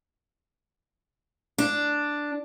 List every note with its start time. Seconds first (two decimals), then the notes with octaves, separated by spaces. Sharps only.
1.58 D4